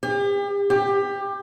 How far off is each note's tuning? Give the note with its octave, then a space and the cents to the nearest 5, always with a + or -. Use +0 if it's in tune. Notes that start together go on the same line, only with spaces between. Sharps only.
G4 +40
G4 +20